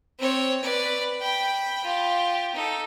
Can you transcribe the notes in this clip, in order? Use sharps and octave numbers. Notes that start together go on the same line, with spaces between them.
C4 C#5
B4 D5
G5 B5
F4 G4
D#4 A4